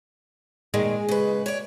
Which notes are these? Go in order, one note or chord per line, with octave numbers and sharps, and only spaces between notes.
A#2 D#3 G#3
C#3 B4
C#5 D5